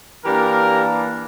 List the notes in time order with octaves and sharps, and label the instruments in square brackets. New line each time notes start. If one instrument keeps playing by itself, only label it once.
[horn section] E3 A#3 D4 G4 A#4